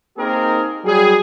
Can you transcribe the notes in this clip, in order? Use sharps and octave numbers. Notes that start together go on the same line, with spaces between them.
A#3 C4 D#4 G4 G#4 A#4
F#3 G3 G4 G#4